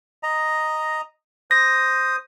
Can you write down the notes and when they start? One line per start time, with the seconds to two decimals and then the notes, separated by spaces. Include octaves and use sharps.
0.23 D#5 A#5
1.51 C5 D#6 A#6